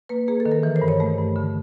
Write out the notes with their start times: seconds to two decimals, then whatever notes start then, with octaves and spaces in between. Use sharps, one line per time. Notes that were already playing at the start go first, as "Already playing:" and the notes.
0.09 A#3 B4
0.28 A#3 G#4
0.40 A4
0.46 D#3
0.52 A#4
0.63 E3
0.76 C5
0.82 G2
0.88 C#5
1.00 A3
1.18 G2
1.36 D3